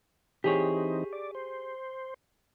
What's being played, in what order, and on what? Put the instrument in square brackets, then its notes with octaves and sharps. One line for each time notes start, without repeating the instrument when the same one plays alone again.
[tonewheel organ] E3 C4 D#4 [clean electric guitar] G4 G#4 C#5
[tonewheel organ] D5
C5